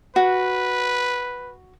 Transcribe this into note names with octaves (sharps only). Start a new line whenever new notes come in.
F#4 B4